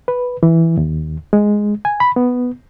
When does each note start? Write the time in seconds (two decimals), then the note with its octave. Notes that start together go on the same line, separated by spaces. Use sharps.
0.08 B4
0.43 E3
0.77 D#2
1.33 G#3
1.85 G#5
2.00 B5
2.16 B3